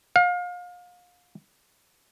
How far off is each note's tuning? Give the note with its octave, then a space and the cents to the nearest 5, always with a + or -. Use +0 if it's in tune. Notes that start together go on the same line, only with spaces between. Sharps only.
F5 +35